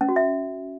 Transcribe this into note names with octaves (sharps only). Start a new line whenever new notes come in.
C#4
F#4
E5